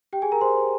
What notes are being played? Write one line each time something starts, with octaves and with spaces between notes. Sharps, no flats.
G4 G5
G#4 G#5
A#4 A#5
C5 C6